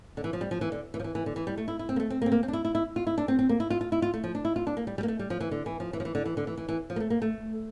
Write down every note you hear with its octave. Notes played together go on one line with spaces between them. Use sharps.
D3
E3
F3
G3
F3
E3
D3
E3
F3
E3
E3
D3
E3
G3
A3
E4
E4
C4
A#3
A3
C4
A#3
C4
A#3
C4
D4
E4
E4
E4
F4
E4
D4
C4
C4
A#3
E4
F4
F4
E4
F4
A3
F3
D4
E4
F4
D4
A#3
G3
G3
A#3
A3
G3
F3
E3
D3
E3
F3
E3
F3
E3
D3
E3
D3
E3
E3
E3
F3
A#3
A3
A#3
A3